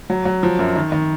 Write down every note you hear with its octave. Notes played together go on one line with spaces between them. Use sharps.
F#3
F#3
F3
F#2
D#3
D#3